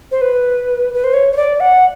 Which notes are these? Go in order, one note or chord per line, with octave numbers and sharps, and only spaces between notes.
C5
B4
B4
C5
C#5
C#5
D5
F#5